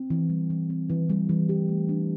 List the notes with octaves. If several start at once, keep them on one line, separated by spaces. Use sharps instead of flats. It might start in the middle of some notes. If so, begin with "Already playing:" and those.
Already playing: C4
E3
G3
E3
C4
E3
G3
E3
G4
A3
D4